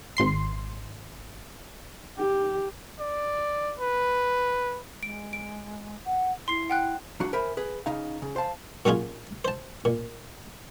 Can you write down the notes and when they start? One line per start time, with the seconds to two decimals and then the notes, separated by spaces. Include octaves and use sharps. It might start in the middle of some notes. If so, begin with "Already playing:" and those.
0.17 G#1 C6 C7
2.18 G4
3.00 D5
3.80 B4
5.03 G#3 D7
5.33 D7
6.05 F#5
6.48 E4 C6 C7
6.70 F#5 G5 F#6
7.20 F#3 D4 F#4
7.33 A#4 C5 E5 G#5 B5
7.57 G#4 B4
7.86 C#3 D#4 F5
8.22 C#3
8.36 C5 F5 A5
8.85 A#2 F#3 C#4 F4 G#4
9.45 C5 A5
9.85 A#2